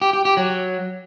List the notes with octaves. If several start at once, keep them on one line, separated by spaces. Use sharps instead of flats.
G4
G4
G4
F#3